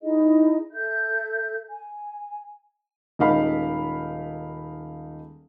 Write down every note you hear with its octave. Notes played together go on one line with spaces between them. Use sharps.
D#4 E4 G#4 D#5
A4 E5 G6
G#5
D#1 G#3 D#4 A#4 F5 B5